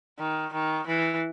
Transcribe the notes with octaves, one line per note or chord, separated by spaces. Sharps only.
D#3
D#3
E3